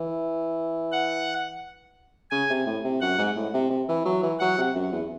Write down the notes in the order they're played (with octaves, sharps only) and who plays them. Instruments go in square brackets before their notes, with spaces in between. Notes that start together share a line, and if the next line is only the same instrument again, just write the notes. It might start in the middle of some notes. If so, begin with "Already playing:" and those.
Already playing: [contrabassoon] E3
[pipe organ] F#5
[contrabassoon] C#3 [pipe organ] G#5
[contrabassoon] C3
A2
C3
[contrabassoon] F#2 [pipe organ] F#5
[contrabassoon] G#2
A2
C3
C3
E3
F#3
E3
[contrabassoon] F#3 [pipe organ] F#5
[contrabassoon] C3
F#2
E2